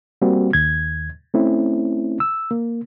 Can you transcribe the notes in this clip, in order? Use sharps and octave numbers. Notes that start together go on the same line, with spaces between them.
G3 A#3 C4 F#4
D#2 G#6
A3 C4 C#4 E4
E6
A#3